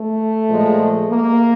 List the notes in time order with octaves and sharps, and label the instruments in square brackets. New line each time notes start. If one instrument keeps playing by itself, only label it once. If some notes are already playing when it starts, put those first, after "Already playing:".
Already playing: [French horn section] A3
A#2 F3 G#3
A#3